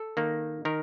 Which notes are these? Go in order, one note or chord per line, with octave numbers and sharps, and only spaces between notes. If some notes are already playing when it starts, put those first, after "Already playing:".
Already playing: A4
D#3 A#3 D#4
D#3 A#4